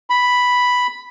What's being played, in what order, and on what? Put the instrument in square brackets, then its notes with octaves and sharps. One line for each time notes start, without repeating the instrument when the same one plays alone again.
[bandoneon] B5